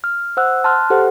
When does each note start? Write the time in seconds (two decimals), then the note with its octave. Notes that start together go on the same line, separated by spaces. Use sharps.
0.04 F6
0.37 C5 F#5 E6 F#6
0.64 A5 C6 F6 F#6
0.90 G4 A4 C5 F#5